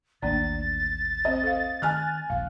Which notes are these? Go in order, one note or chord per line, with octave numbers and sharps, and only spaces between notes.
A1 D#2 A#3 D4 D5 A6
C4 C5 D#5
A4 C5 F5
D#3 G#5 F6 F#6
D#1 A#1 F5